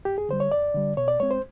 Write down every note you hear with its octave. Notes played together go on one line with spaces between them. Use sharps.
F#2 G4
G#4
D3 G3 C5
C#5
F#2 D5
D3 G3
B2 C#5
D5
G#3 C4 C#5
C5